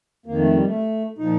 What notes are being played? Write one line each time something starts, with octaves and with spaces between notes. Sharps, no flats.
F2 D#3 A#3
A3
G3
A3
A#2 F3 D#4